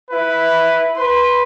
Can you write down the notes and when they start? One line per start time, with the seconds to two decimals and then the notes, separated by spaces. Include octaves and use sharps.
0.10 E4 B4
0.96 B4 C6